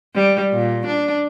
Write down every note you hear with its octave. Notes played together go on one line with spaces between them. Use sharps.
G3
A#2
D4